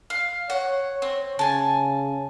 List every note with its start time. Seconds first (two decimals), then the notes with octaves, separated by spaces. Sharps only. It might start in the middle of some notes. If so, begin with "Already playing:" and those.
0.10 F5
0.50 C#5 F#5
1.02 C4
1.39 C#3 G#5 A5